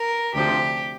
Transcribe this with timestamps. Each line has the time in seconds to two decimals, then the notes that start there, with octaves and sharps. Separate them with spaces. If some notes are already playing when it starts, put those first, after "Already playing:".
Already playing: A#4
0.35 D2 C3 F3 G4